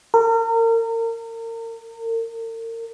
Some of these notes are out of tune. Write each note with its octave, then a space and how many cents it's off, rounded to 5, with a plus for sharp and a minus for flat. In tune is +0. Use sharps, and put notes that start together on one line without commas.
A#4 -35